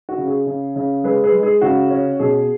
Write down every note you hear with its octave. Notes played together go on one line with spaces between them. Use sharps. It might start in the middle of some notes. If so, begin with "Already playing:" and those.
F#4
C#3
G#4
C#3
C#3
G#3 G#4 B4
G#4 B4
G#3
G#4
C#3 F#4
C#4
B2 G#4